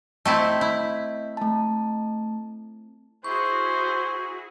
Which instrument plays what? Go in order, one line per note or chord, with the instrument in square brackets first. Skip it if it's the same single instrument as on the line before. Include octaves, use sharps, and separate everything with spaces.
[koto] A3 C4 E4 [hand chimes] D#5 G6 B6
[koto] E4
[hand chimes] A3 A5
[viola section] E4 F#4 G#4 [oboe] C5 [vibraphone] C#6